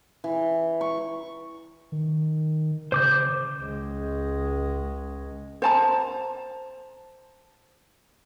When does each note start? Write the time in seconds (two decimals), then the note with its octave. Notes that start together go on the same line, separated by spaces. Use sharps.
0.24 E3
0.81 C#6
1.92 D#3
2.92 C#3 C5 D6 G6
3.60 C#2 G#3
5.62 C5 A5 A#5